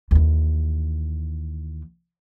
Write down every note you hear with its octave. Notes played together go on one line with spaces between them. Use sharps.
D#2 E3